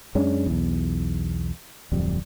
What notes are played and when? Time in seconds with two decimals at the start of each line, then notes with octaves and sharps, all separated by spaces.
0.15 F#2 G#3 C#4 D4
0.46 B1 E2
1.92 D1 F2 G3